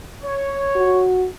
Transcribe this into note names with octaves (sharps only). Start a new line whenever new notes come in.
C#5
F#4